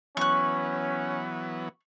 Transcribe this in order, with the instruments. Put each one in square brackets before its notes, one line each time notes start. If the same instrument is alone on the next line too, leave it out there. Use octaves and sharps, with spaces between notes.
[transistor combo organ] E3 F#3 B3 [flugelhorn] C#4 [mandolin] C#6 F#6